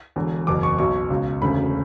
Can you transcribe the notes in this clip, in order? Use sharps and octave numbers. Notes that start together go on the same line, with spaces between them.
E1 E2 D3
F#1 E2 B2 D6
C#6
B1 B2 C#6
C#2 B2
E1 D2 C#3 B5